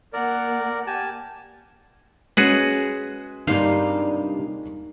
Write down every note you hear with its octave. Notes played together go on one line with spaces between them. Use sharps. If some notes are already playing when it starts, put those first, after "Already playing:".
A#3 A#4 D5 F#5
G4 G#5 A5
G#3 C#4 F#4 G#4 B4
G2 C3 A#3 D#4 F4 F5